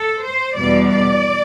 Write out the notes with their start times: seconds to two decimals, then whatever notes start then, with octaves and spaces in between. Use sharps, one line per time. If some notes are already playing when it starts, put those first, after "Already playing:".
Already playing: A4
0.25 C5
0.57 E2 B2 G3 D5
0.88 D5